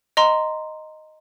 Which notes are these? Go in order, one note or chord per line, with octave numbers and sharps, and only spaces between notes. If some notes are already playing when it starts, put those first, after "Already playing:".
D#5 A#5 C6